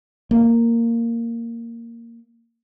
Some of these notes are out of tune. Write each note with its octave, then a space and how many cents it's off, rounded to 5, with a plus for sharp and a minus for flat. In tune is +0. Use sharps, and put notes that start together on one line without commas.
A#3 -10